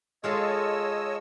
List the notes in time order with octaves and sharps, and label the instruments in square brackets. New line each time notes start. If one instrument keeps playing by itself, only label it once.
[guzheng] G#3 F4 A4 [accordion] C#5 D#5 E6